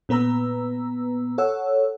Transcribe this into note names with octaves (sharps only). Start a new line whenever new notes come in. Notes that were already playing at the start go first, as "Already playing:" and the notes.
A#2 B3 B4 A#5 E6
A4 C#5 F#5 E6